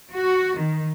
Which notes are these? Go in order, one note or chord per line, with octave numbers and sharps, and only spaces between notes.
F#4
D#3